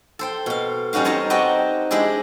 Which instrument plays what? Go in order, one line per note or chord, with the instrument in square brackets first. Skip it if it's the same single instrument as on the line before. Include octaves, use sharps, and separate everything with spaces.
[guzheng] A4 C5 G5
B2 F5
G3 C#4 D#4 F#4 F5
C4 D#4 C#5 A5 A#5
C4 F#4 G4 D#5 G5 A5
G#3 D4 E4 G4 G#4